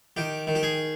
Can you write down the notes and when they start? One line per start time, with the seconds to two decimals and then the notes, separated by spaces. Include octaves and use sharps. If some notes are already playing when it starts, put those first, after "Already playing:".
0.17 D#3 G4
0.47 D#3
0.55 G4
0.63 G#4